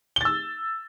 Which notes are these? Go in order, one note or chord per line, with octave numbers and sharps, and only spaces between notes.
E6 A6 G7